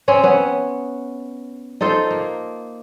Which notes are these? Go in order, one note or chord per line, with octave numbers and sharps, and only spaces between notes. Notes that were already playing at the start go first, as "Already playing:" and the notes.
C4 C#4 C#5
B3 C#4
D#4 F4 A4 C5
A#3